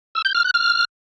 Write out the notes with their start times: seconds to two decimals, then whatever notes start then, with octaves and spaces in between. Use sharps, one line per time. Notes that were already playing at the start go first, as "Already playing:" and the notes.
0.15 E6
0.25 G6
0.35 F6
0.44 F#6
0.54 F6